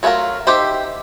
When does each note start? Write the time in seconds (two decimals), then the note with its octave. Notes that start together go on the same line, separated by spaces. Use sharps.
0.03 F#3 A3 C4 F4 A#4
0.47 D#4 G4 C5 E5